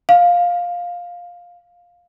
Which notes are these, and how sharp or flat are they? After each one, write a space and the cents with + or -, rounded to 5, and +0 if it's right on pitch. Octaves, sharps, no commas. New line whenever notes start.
F5 +10